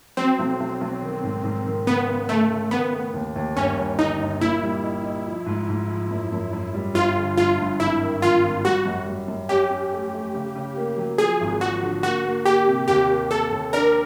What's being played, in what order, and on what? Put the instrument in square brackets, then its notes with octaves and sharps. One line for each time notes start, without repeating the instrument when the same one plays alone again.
[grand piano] F#3 [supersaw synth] C4
[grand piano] B1
B1
B1
D#3
G#2
G#2
D#3
[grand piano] C#3 [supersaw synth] B3
[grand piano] C#3
[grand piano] C#3 [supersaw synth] A3
[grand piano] C#3
[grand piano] D#3 [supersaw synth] B3
[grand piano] A3
D#2
D#2
[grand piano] G1 [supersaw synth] C#4
[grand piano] G1
[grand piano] D3 [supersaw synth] D#4
[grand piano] G1
[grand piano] A#2 [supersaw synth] E4
[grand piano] G3
D#4
D#4
F3
G#2
G#2
F3
F#2
F#2
F#2
G3
[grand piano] G1 [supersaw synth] F4
[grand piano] D3
[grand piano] G1 [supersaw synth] F4
[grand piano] G2
[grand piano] G#1 [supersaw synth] E4
[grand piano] D#3
[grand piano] G#1 [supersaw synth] F4
[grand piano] G#1
[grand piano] G3 [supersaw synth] F#4
[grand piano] F#2
G3
F#2
[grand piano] C#4 [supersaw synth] G4
[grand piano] C#4
A3
A3
C#3
C#3
A#3
F#3
[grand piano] F3 [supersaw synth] G#4
[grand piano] G#1
[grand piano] F3 [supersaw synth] F#4
[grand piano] D3
[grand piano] A#3 [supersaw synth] F#4
[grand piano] A#3
[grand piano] A#3 [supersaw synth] G4
[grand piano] C3
[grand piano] D#2 [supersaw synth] G4
[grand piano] A#3
[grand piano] A#3 [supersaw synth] A4
[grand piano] D#2
[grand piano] D4 [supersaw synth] A#4